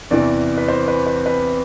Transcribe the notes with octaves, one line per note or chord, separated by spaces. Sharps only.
E2 C3 E3 D5
B4
C5
B4
B4
B4